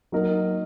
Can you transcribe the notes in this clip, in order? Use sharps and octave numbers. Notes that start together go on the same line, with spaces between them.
F#3 A#3 D#4 A#4